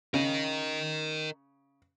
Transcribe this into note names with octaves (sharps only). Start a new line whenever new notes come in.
C#3 A#4 D#5